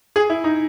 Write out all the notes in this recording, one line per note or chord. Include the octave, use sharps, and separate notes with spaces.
G#4
E4
D#4